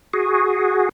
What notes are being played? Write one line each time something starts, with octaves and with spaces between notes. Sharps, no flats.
F#4 G#4